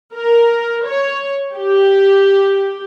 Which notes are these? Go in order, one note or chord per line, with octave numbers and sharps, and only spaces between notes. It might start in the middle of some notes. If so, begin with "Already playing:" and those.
A#4
C#5
G4